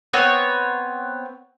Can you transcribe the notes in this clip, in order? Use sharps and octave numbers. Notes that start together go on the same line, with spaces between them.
B3 C4 C#5